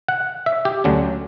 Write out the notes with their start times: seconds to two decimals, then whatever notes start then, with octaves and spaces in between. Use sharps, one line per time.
0.08 F#5
0.46 E5
0.65 G4
0.84 D2 D3 F#3 C#4